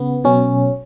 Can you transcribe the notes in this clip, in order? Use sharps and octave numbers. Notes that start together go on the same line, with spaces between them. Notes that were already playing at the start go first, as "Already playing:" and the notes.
Already playing: C#3 B3
B2 F#3 C#4